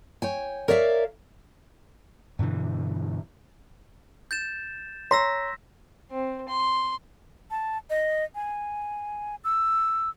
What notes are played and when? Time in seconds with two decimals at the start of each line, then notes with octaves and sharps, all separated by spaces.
0.22 C#5 G5 G#5
0.68 A#4 C#5 D5 E5 F5
2.39 G2 B2 D3 E3
4.31 G6 A6 E7
5.11 C#5 A#5 C6 E6 A#6 B6
6.11 C4
6.49 C6
7.51 A5
7.90 D#5
8.35 G#5
9.44 E6